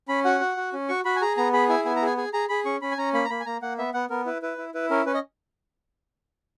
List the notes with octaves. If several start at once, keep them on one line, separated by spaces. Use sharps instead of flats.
C#4 B5
F#4 F#5
F#4
F#4
C#4
F#4 C#6
F#4 B5
G#5
G#4 A#5
B3 A#5
G#4 B5
E4 G#5
B3 G#5
A#5
G#4 G#5
G#4 G#5
G#4 A#5
G#4 B5
C#4 C#6
C#4 B5
G#5
C#4 A#5
A#3 B5
A#5
A#3 B5
G#5
A#3 A#5
A#3 F#5
B3 E5
B3 F#5
B3 A#4
E4 B4
E4 B4
E4
E4 B4
C#4 A#4
C#4 B4
D#5